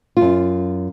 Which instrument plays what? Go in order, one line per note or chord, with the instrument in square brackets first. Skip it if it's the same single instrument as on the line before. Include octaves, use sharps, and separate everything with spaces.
[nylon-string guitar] F#2 F4